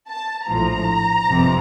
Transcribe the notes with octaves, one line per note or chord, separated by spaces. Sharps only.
A5
A#1 A2 F3 A#5
G1 F2 C3 F3